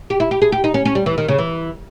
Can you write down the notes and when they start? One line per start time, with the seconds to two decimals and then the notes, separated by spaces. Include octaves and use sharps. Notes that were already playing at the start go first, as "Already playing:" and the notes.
0.10 G4
0.20 E4
0.31 G4
0.42 G#4
0.52 G4
0.64 D#4
0.74 C#4
0.85 C#4
0.95 G3
1.06 E3
1.18 D#3
1.28 C#3
1.38 E3